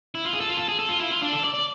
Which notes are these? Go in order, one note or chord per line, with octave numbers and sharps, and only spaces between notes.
E4
F4
G#4
A4
F4
A4
G#4
A4
F4
E4
F4
D4
A4
D5
D5